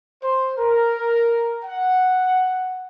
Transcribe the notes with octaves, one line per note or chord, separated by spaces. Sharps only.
C5
A#4
F#5